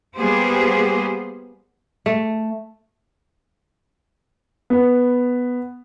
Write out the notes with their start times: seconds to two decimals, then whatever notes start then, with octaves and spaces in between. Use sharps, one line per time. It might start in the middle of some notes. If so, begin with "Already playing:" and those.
0.18 G3 A#3 B3 G4 G#4 C5
2.06 A3
4.70 B3